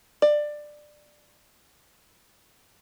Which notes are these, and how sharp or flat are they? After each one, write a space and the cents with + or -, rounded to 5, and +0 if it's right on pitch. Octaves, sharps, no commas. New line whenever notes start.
D5 +15